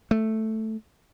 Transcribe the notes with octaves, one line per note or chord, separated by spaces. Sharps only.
A3